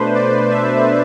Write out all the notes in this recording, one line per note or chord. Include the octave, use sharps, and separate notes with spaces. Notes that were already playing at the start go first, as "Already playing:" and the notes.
Already playing: B2 A3 D4 B4 C5
D5
E5